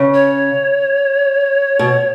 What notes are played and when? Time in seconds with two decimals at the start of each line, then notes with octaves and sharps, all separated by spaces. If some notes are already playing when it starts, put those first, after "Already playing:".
Already playing: C#3
0.14 C#5
1.79 B2